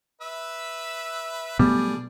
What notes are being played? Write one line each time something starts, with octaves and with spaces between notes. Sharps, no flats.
B4 E5 E6
B2 F#3 G3 A3 B3 D4 G#4